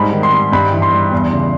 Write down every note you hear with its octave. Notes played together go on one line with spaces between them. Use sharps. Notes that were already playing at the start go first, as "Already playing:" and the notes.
Already playing: G#2 G3 B5
D#3
C6
G3
G2 B5
E3
C6
G3
E2
C#3